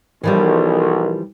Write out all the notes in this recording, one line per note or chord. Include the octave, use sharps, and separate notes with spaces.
B1 E3 F3 G3 A#4